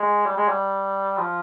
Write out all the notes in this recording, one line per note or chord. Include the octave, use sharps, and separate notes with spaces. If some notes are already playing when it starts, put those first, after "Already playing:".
Already playing: G#3
G3
G#3
G3
F3